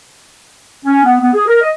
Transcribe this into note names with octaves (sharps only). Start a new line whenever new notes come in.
C#4
B3
B3
G#4
A#4
D#5